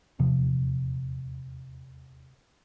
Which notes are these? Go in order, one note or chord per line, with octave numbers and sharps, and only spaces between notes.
D#1 E2 C3 F3